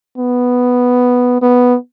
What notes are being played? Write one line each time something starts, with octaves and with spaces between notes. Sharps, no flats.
B3
B3